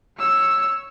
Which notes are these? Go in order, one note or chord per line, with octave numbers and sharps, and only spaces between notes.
C#5 E6